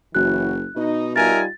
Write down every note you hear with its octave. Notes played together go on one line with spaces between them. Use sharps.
F#1 E3 F#3 F#4 F#6
B2 D#4
G3 D#4 F4 A#4 E5 G#5 A6